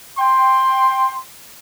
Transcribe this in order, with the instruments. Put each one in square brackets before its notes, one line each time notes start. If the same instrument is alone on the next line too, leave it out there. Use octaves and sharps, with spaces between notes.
[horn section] G5 C6